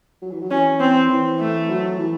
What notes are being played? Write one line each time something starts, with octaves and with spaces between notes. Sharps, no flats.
F#3
E3
F#3
E3 C#4
C4
E3
A3
F#3
E3